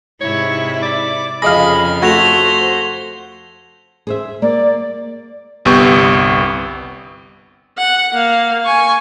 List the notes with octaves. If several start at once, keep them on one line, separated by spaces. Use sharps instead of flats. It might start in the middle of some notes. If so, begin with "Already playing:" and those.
G#2 C3 E4 C#5
D5
F2 C#3 F3 G#4 D#5 F5 B5 A#6
A3 F#4 C5 G#6 A#6 F7
G#4 C5 E5
A#3 D5
G1 C2 B3 G4 C#6 G6
F#5
A#3 F5
G#5 C#6